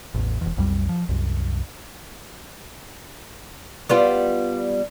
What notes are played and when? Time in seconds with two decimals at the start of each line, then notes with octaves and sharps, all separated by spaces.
0.14 A1 E2
0.41 E1 E2
0.57 B1 F2 F#3 G3
0.89 F3
1.09 C2 F#2
3.89 G3 B3 F4